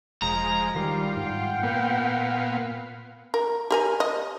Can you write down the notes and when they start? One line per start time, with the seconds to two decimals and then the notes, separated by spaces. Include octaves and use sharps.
0.22 E1 F3 G#3 A#5
0.75 D#3 G3 F4
1.17 G#2 F#5 G5
1.63 A#2 A#3 B3 F5
3.34 A#4
3.71 G4 A#4 G#5
4.00 D#5